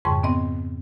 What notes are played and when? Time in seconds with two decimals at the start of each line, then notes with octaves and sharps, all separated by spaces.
0.05 F2 G#2 C#3 G3 C#6
0.23 B3 C4 D#5